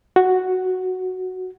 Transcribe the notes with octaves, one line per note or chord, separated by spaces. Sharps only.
F#4